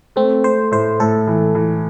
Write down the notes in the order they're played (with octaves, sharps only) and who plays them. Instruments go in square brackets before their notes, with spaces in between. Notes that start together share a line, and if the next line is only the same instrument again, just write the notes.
[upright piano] A3 [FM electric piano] C4
[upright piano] A3 [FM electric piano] C5
[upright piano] A2 [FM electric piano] C5
[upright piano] A2 [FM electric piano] A4
[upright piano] E3
E3